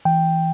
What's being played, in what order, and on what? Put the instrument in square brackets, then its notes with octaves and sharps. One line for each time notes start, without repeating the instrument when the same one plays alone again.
[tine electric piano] E3 G5